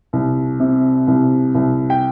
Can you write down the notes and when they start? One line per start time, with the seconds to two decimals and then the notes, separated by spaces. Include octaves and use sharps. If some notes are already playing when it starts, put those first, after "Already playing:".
0.13 C2
0.60 C3
1.07 C2
1.55 C2
1.90 G5